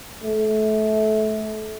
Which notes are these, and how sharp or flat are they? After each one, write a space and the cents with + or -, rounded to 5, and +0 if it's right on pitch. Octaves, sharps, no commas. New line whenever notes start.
A3 -25